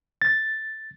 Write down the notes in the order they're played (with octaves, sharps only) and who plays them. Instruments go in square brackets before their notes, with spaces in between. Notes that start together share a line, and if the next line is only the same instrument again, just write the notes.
[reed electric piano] A6